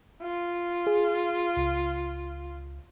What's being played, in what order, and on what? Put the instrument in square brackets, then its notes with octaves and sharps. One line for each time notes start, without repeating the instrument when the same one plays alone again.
[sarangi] F4
[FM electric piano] G#4
C#2